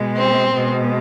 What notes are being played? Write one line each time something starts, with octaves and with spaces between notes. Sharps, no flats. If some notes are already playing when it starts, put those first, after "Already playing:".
Already playing: B2 G#3
C4
B2 G#3